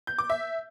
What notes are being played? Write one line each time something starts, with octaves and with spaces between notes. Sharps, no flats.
G6
D6
E5